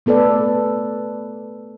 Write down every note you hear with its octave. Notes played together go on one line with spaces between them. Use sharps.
A3 B3 A4 B4 D5